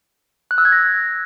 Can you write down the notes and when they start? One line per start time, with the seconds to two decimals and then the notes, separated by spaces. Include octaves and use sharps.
0.51 F#6
0.58 E6
0.65 G#6
0.72 A#6